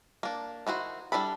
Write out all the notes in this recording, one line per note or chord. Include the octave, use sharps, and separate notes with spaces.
A#3 D4
D#3 E4 F#4 C5
G3 D4 E4 A4 B5